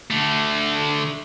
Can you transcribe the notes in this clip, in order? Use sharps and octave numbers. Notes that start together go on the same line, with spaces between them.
D3 A3